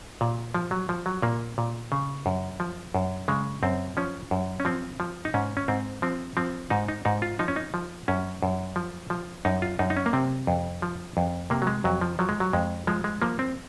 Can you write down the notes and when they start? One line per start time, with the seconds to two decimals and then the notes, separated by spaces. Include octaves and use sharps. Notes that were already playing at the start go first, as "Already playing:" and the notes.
0.21 A#2
0.54 F3
0.71 F#3
0.89 F3
1.06 F#3
1.22 A#2 A#3
1.58 A#2
1.92 C#3
2.26 F#2
2.60 F3
2.95 F#2
3.28 C#3 G#3
3.63 F#2 C4
3.97 F3 C#4
4.31 F#2
4.60 C#4
4.65 F3 C4
5.00 F3
5.25 D#4
5.34 G#2 C#4
5.57 C#4
5.68 G#2 C4
6.02 F3 C4
6.37 F3 C4
6.70 G#2 D#4
6.88 D#4
7.05 G#2 D#4
7.22 F4
7.39 F3 D#4
7.48 C#4
7.56 D#4
7.74 F3
8.08 F#2 C#4
8.43 F#2
8.76 F3
9.10 F3
9.45 F#2 D#4
9.62 F4
9.79 F#2 D#4
9.90 D#4
9.97 C#4
10.06 A#3
10.13 C3 C4
10.47 F2
10.82 F3
11.17 F2
11.50 C3 A#3
11.62 F#3
11.67 G#3
11.84 F2 F#3
12.01 F3
12.19 F3 F#3
12.29 G#3
12.40 F#3
12.53 F2 G#3
12.87 F3 G#3
13.04 G#3
13.22 F3 A#3
13.39 C4